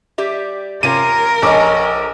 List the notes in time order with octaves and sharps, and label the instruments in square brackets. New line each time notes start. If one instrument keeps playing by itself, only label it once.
[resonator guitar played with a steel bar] G3 G4 E5
[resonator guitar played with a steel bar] C3 C#4 F4 [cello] A#4 [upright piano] D#7
[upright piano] A#1 D6 [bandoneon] C#4 [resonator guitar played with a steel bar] A4 D#5